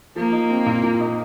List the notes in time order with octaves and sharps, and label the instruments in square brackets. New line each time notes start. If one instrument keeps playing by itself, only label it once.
[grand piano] F3 [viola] A#3
[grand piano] D#4
C4
A#2
A#2
D#4